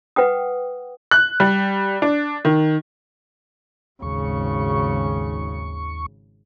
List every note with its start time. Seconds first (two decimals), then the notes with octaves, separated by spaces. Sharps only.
0.16 B4 F#5 G5 D#6
1.11 F#6
1.40 G3
2.02 D4
2.45 D#3
4.02 G#1 D#2 C#3 C#6